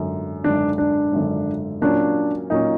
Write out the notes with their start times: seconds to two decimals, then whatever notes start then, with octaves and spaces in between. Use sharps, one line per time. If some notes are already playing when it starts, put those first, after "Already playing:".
Already playing: G#1 F#2 D3
0.44 G#1 F#2 D3 D4
0.78 D4
1.12 G#1 F#2 D3
1.82 A#2 F#3 A#3 C#4 D4
2.50 A#2 F#3 A#3 C#4 D#4